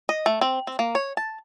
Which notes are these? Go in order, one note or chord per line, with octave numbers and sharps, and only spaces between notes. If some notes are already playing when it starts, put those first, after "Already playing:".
D#5
A3
C4
C4
A#3
C#5
A5